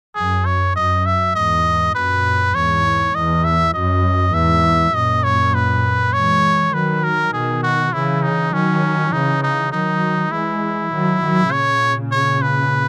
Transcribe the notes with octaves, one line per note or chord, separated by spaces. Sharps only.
F#2 G#4
C#5
F#2 D#5
E5
E2 G#2 D#5
F#2 A#2 B4
E2 G#2 C#5
E2 D#5
E5
F#2 D#5
E2 G#2 E5
F#2 A#2 D#5
C#5
B4
E3 G#3 C#5
D#3 F#3 B4
A#4
B2 D#3 G#4
F#4
C#3 E3 E4
D#4
D#3 F#3 C#4
C#3 E3 D#4
D#4
D#3 F#3 D#4
E3 G#3 E4
D#3 F#3
D#3 F#3
A#2 C#3 C#5
C#5
B4